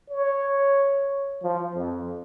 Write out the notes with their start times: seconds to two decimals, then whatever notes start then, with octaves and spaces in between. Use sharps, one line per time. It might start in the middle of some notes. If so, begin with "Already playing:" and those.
0.10 C#5
1.43 F3
1.75 F2